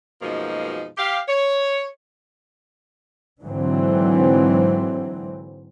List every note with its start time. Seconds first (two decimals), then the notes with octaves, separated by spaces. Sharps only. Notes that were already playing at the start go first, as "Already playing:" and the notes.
0.21 F#2 B2 F3 G#3 A#3 D#4
0.97 G4 F5
1.28 C#5
3.43 G#2 D3 E3 F#3 C4